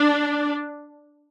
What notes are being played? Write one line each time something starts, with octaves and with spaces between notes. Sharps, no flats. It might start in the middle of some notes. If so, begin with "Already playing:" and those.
Already playing: D4